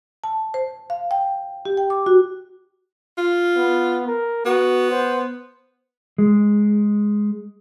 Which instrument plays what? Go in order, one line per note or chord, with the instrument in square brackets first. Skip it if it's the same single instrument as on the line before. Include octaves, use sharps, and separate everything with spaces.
[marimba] A5
C5
F5
G5
G4
G5
D6
F#4
[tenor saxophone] F4
[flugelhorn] B3
A#4
[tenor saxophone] B3 [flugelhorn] F#4
[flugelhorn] C5
[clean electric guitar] G#3